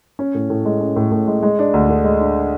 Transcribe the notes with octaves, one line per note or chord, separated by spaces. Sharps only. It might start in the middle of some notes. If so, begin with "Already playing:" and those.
C#4
A2
A2
G#3
C#4
A2
A2
G#3
G#3
D4
D2
D3
G#3
D4